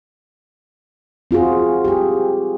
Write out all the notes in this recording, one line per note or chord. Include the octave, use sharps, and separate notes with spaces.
C4 F4 F#4 G#4
G4 G#4